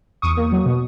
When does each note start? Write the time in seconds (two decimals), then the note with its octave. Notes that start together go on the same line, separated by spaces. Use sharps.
0.22 E2 C#6 D#6
0.37 A#3
0.52 F#3
0.66 B2